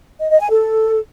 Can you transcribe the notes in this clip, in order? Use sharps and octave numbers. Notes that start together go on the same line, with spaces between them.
D#5
D#5
G#5
A4